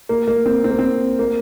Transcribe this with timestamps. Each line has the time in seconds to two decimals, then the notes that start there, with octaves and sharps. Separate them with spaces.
0.09 A#3
0.28 A#3
0.46 C4
0.64 C4
0.71 A#3
0.79 C4
1.19 A#3